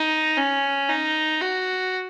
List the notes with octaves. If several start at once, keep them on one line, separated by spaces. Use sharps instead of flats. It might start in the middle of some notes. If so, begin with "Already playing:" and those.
Already playing: D#4
C#4
D#4
F#4